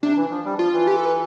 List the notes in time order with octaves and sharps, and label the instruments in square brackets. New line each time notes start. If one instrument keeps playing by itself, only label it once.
[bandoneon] C3 [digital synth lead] D4
[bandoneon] E3
F3
G3
[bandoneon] F3 [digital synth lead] F4
[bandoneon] E3
[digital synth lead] G4
A4
B4